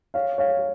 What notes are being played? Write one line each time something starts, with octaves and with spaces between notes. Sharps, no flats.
C#5 F5
C#5 F5